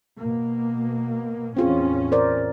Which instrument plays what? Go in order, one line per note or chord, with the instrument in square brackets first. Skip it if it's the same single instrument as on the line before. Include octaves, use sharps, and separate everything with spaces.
[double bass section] B2 A#3
[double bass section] E2 A2 C#4 [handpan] C4 F4 G#4
[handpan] A#4 C5 D5